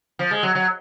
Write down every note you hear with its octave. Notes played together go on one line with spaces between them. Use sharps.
F3
G#3
F#3
F#3